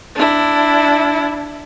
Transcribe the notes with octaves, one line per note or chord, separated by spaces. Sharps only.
D4 E4